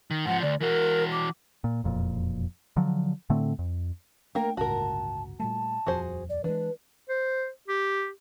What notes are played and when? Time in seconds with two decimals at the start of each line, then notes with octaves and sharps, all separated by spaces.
0.11 D#3
0.26 G#2 F3 F#5
0.42 D2 D5
0.61 E3 F#4 A#4
1.12 D6
1.64 A#2
1.84 E1 F2 A#2
2.77 D3 F3 F#3
3.30 A2 D3 A3 C4
3.59 F2
4.35 A3 A#3 D4 A#4 G5
4.57 G1 C#2 A2 F#4 A#4 A5
5.40 A#2 G3 A3 A5
5.86 D#1 F2 F3 F#4 G#4 C5
6.29 D5
6.44 E3 G#3 D4 B4
7.09 C5
7.68 G4